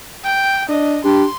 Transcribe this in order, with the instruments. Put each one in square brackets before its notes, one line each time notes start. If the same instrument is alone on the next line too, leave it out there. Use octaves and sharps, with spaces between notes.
[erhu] G5
[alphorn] D4 [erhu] D#5
[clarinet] D4 [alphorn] G4 [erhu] C6